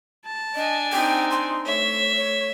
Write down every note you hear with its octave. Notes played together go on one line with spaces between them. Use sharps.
A5
D4 D#5 G#5
C4 D#4 G5
C6
A3 C#5 E5
C#5